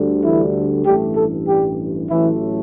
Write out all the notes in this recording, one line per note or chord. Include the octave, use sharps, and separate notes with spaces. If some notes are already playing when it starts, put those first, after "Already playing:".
Already playing: D2 D3 G3
E3 E4
A1 G2 E3 G3 A3 G4
A3 A4
G3 G4
A1 A2 E3 F#3 A3 E4